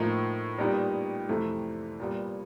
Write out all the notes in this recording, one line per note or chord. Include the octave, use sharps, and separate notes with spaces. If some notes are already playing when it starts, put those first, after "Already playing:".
Already playing: A2 F3 A#3 D#4
A#2 G3 B3 D#4 G4
F2 C3 E3 A3
A#2 G3 B3